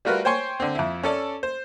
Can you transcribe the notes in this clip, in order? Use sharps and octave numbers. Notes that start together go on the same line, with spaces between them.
G3 A3 F4 F#4 A#4 B4
C5 C#5 G5 G#5 C6 C#6
D3 C4
F2 E4
C#4 A4 D5
C5